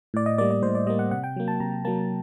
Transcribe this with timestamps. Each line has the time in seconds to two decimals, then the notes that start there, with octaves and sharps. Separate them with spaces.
0.14 A2 D5
0.26 D#5
0.38 G3 A#3 D5
0.51 D5
0.63 A2 C5
0.75 D5
0.87 G3 A#3 D#5
0.99 F#5
1.11 C3 F#5
1.24 G5
1.36 F#3 A#3
1.48 A5
1.60 C3 A#5
1.85 F#3 A#3 A5